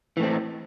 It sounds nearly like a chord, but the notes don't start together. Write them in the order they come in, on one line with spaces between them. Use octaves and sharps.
E3 A2 C4